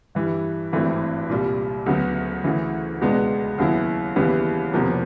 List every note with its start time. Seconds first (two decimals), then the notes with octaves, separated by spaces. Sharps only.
0.15 G2 E3 G3
0.72 G#1 G2 E3 A3 C4
1.29 C2 A#2 G3
1.86 D2 C#3 F#3 B3
2.44 D2 C#3 E3
3.01 C#2 B2 G#3 B3 D4
3.58 D#2 C#3 F#3 B3 E4
4.16 D#2 C#3 E3 G3 B3
4.73 E1 E2 C3 F3 A#3